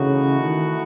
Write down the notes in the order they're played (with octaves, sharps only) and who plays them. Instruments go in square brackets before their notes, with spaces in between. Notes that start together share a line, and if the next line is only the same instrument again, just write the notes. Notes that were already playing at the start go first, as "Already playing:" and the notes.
Already playing: [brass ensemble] C#3 [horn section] E3 A3 D#4 F#4
[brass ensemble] D#3